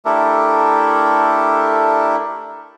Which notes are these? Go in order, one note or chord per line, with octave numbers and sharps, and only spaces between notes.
A3 D4 E4 G4 A4 A#4